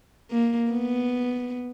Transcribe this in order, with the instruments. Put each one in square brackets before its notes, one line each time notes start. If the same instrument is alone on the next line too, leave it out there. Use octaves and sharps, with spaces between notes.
[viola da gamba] A#3
B3